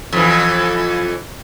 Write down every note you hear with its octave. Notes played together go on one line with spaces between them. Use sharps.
F2 E3